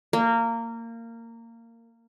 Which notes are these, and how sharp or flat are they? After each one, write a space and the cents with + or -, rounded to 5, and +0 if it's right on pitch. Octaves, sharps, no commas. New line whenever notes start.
A#3 -20